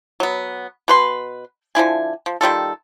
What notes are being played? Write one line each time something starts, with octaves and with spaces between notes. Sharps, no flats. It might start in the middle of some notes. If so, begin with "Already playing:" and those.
F#3 B3
B2 B4 C6
D3 F3 E4 G#5
F3
D#3 G3 F4 A4